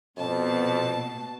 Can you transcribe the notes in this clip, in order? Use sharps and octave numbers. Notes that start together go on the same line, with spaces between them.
F2 B2 A5